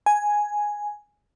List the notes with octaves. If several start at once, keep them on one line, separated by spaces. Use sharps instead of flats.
G#5